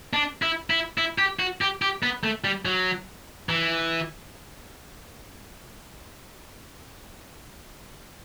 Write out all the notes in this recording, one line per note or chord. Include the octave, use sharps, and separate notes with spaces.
D4
E4
E4
E4
G4
F#4
G4
G4
B3
A3
G3
F#3
E3